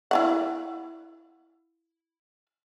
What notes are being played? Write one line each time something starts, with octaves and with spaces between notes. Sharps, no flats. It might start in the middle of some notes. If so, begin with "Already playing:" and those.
E4 F4 F#5